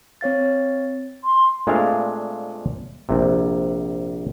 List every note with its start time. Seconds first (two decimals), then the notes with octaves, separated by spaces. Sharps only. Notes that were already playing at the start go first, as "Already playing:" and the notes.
0.21 C4 C#5 F5 A6
1.24 C6
1.67 A#2 G#3 A3 C4 D4 F5
3.09 A#1 C3